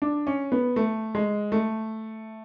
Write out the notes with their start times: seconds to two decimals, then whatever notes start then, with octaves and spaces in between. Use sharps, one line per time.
0.02 D4
0.27 C#4
0.52 B3
0.76 A3
1.15 G#3
1.52 A3